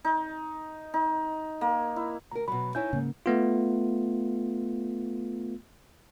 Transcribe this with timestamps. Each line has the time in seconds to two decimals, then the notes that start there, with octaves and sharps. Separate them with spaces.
0.04 D#4
0.94 D#4
1.61 A#3
1.96 E4
2.31 D2 A#4 A#5
2.48 B2 F#3 B5
2.75 D#4 E4 C#5 E5 G#5 G6
2.93 G#2 C#3 A#3
3.26 A3 B3 F4